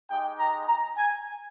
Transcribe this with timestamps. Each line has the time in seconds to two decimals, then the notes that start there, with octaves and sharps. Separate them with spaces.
0.10 G#3 D#4 G4 G5
0.39 A#5
0.68 A#5
0.97 G#5